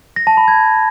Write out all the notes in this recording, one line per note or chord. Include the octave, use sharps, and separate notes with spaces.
A#6
A5
B5
G#6